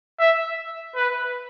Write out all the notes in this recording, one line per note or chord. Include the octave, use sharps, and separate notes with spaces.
E5
B4